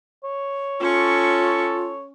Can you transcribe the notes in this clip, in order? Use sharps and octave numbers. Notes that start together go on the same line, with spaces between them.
C#5
C#4 F4 A4 C#6